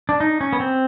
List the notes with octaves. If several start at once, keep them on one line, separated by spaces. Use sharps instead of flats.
D4
D#4
C#4
B3
C4